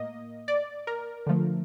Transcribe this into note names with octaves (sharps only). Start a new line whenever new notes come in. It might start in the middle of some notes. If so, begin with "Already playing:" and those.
Already playing: A2 A#3 D#5
D5
A#4
D3 F3 A3